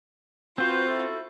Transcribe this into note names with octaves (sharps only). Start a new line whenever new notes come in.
C4 F4 F#4 B4 C5
E4 F#4 A4